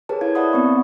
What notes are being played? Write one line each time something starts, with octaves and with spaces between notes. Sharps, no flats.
G4 G#4 A#4 B4 C#5 A5
E4 C#5 F5 G#6
D5 E5 F#5 A5 B5 D#6
B3 C4 C#6